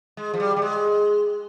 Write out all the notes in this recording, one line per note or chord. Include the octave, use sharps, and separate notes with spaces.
G#3
F3
G3
G3
G#3